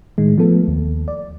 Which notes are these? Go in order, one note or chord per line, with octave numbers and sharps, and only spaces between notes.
A2 D#3 G#3
F3 A3 B3 A4
D#2
D5